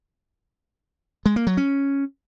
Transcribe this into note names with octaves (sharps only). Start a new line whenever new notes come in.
G#3
A#3
F#3
C#4